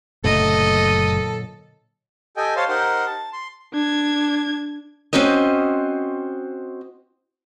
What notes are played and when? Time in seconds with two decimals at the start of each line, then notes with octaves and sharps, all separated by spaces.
0.24 F#1 A#2 D3 F#3 A3 A4 D#5
2.37 G4 A4 D#5 G5 G#5
2.56 C5 C#5 F5 A5 C6
2.69 D#4 G4 A#4 C5 F#5 C6
3.06 A5
3.33 C6
3.73 D4 G#6
5.13 C4 C#4 F#4 C5 D#5